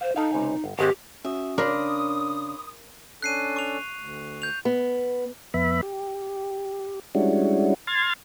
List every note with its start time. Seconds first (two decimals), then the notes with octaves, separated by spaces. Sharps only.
0.01 C5 F5
0.16 D#4 A4 D#5 F5
0.33 C#2 C3 G#5
0.64 G1
0.79 G#1 G#3 C4 G4
1.25 C#4 F#4 E5 D#6
1.58 C#3 D4 A#4 B5 C6 D6 D#6
3.22 C#4 D4 A4 F#6 C7 D#7
3.56 C#6 F7
3.98 D2
4.42 G6 F7
4.65 B3
5.54 F2 B3 E5 B5
5.83 G4
7.15 G3 G#3 C#4 D4 E4 F#4
7.87 C6 F6 G#6 A6